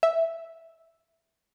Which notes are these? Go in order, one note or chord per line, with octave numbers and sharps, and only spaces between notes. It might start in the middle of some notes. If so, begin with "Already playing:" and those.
E5